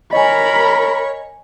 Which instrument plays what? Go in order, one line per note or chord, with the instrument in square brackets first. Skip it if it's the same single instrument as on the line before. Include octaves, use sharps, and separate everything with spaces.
[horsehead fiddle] A#4 B5 [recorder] C#5 [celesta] D#5 G#5